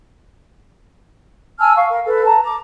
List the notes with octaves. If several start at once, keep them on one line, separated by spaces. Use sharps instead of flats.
G#5 A5 E6 F6
F5 C#6
A#4
A4 B4
A5 A#5
A#5 D6